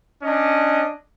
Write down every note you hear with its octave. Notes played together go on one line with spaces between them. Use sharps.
C#4 D4 D#5